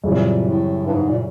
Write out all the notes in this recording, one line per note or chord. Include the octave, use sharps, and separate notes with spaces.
F#2 A#2 C#3 E3 G3 C4
A2
G2
G#2
A#2